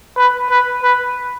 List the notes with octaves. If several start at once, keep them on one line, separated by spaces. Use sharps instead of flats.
B4
B4
B4